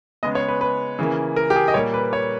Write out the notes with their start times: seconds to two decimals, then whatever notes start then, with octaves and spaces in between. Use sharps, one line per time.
0.23 C#3 G#3 B3 D#5
0.35 C#5
0.48 B4
0.61 B4
0.99 C#3 E3 A#3
1.36 A#4
1.50 G4
1.56 G#4
1.68 D#5
1.74 A#2 G3 A#3 C#5
1.94 B4
2.13 C#5